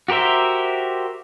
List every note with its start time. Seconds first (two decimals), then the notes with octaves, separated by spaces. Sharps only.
0.08 F#4 G4 A#4 C5 E5